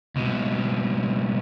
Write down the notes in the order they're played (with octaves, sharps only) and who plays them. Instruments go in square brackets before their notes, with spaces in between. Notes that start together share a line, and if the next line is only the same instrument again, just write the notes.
[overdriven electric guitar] C#2 B2